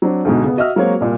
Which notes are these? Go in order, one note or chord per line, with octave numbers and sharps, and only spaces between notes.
F#3 C4 D4
D2 G#2 B2
C#3 B3
F#4 D#5 E5 E6 F6
F#3 G#3 A#3 C4 F#4 C#5
C2 A#2